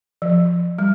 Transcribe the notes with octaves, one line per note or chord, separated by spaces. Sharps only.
F3
G3